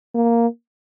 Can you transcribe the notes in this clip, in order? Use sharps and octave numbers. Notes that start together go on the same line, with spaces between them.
A#3